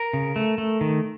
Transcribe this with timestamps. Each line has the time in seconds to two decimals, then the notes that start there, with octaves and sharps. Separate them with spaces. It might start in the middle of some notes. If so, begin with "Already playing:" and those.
Already playing: A#4
0.13 C#3
0.36 A3
0.58 A3
0.81 D#3